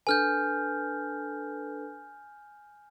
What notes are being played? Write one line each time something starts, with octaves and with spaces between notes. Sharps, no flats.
D4 A4 B4 G#5 F6 G6